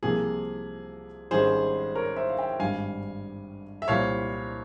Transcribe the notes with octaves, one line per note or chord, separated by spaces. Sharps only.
C2 C3 F3 A#3 G#4
G#1 G#2 G3 C#4 G#4 C5
A#4 C#5
C5 E5
F5
E5 G5
G#1 G2 G3 F5 G#5
E5
C2 A#2 G3 C4 C#5 F5